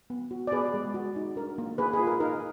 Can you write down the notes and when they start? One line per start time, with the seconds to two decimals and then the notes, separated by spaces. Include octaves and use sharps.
0.10 B3
0.31 F#4
0.47 D5
0.52 B3 G#4 B4
0.74 G#3
0.94 F#4
1.16 D#4
1.36 D4 A#4
1.58 A#3
1.78 A#3 G#4 B4
1.93 G#4 B4
1.99 F4
2.07 A#4
2.20 D#4 A#4